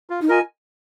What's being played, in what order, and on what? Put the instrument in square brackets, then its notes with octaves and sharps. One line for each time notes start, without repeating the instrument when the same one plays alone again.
[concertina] F4
[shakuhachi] D#4
[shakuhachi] F4 [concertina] A#4 D#5 G#5